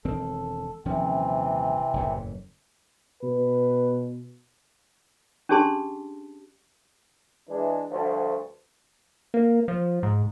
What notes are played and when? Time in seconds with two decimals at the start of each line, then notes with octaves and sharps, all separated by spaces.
0.05 E1 D#3 C4 A4
0.85 D#1 C3 E3 F3 C4 C#4
1.94 F#1 E2 A2
3.23 B2 B4
5.49 C#4 D4 G4 G#4 A5 C6
7.49 E3 G#3 D4
7.90 D2 G2 D3 F3 F#4 C5
9.34 A#3
9.68 F3
10.03 G#2